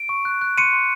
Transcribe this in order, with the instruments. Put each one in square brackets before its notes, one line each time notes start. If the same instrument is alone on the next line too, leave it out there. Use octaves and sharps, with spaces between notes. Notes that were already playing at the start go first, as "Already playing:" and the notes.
Already playing: [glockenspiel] D7
C#6
F#6
F#6
C6 C#7 D#7
C6